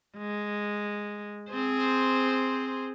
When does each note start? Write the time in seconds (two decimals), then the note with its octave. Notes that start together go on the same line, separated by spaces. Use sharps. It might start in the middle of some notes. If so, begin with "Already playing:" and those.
0.17 G#3
1.51 C4 G#4 C5